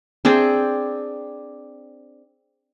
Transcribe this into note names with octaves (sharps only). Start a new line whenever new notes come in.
C4 D4 G#4 D5